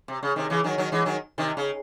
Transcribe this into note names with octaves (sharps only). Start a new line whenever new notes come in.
C3
C#3
C3 D#3
C#3 E3
D#3 F#3
D#3 F#3
E3 G#3
D#3 F#3
C3 D#3
C#3